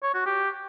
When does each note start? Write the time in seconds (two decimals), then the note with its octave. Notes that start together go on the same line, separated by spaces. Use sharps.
0.03 C#5
0.14 F#4
0.26 G4